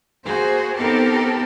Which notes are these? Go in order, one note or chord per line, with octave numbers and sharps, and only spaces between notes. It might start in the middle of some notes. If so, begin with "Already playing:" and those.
A#3 F#4 G#4 C5
B3 C4 D#4 G4 A4 A#4